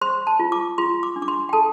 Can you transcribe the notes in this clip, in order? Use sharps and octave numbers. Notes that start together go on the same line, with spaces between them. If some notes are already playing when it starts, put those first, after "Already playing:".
C5 C6
A5
F4
D6
F4 C6
D6
D4
D6
C6
G5
A4 A5